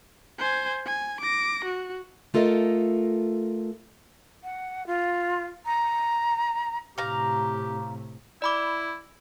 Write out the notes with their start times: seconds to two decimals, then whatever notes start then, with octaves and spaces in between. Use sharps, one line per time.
0.38 C5 G#5
0.86 G#5
1.21 D6 A#6
1.65 F#4
2.34 A3 F4 A4 A#4 D#5
4.44 F#5
4.86 F4
5.66 A#5
6.98 A2 C3 G4 F5 A#5
8.42 E4 D5 B5 D6